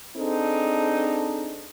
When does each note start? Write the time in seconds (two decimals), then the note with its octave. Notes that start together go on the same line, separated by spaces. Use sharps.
0.17 C4 D4 D#4 G#4 A4